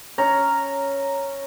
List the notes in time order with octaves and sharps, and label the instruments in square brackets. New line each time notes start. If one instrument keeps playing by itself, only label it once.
[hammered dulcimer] C#4 A#5